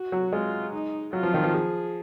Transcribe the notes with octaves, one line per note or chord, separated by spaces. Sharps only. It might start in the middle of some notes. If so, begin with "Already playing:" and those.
Already playing: F#4
F#3
G#3 F4
D#4
F#3 F4
F3
D#3
F3
G#4